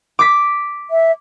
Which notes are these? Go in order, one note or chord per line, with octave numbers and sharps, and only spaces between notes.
D6 B6
E5